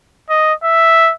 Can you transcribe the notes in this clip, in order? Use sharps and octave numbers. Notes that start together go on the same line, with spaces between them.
D#5
E5